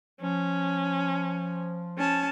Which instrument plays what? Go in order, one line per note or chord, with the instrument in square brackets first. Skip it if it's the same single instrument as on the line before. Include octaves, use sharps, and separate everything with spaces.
[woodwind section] F3 [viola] C#4
[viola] C#4 A5